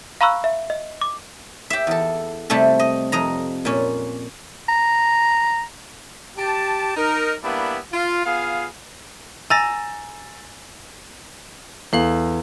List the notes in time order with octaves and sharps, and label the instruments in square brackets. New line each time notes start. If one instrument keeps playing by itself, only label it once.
[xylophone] F5 A#5 B5 C#6 E6 F#6
E5
D#5
D6
[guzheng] G4 E5
E2 A4
C3 G3 A3 A4
D#5
F2 D#5 A#5
A#2 C#4
[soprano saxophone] A#5
[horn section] G4 A5
D#4 A#4
G3 A#3 B3 D4 E4
F4
B3 F4 G#4 F5
[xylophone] G#5 A#5 A#6 [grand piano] E6 A6
[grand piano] E2 [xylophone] A4 F5 F#7